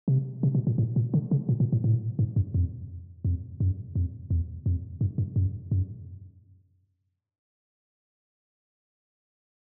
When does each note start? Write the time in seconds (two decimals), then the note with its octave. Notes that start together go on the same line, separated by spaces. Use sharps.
0.08 C3
0.43 C3
0.55 B2
0.67 A#2
0.78 A2
0.96 A#2
1.14 D3
1.31 C#3
1.49 A#2
1.60 A#2
1.72 A2
1.84 A2
2.19 G#2
2.36 F#2
2.54 F2
3.25 F2
3.60 F#2
3.95 F2
4.30 E2
4.66 F2
5.01 G2
5.18 G2
5.36 F#2
5.71 F#2